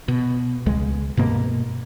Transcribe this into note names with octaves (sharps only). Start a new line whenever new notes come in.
B2
C#2 G#3
G2 B2 A#3